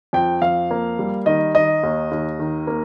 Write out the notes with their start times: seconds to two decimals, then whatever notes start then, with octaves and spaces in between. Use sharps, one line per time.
0.13 F2 G5
0.42 F2 F5
0.71 A#3
0.99 G3
1.26 D#3 D#5
1.55 D#3 D#5
1.83 D#2
2.11 D#2
2.39 D#3
2.67 A#3